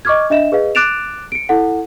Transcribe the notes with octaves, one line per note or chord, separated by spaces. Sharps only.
D#5 C#6 D6 F6 G#6
D4 D#5 E5 E7
G#4 B4 D#5 F5
D6 F#6 A6 D7 E7 F7
C#7 D7
E4 A4 F#5